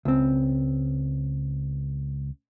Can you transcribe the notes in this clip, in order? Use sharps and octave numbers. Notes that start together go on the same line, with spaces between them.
C#2 C4